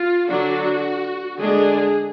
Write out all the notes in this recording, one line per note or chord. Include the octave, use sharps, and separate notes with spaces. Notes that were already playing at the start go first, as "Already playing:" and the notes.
Already playing: F4
D3 F#3 D4 F#4
D3 G#3 D4 G#4